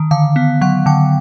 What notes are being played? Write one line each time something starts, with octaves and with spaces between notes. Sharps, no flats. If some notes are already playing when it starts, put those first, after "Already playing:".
Already playing: D#3
D3 F5
B3
F#3 F#5
D3 G5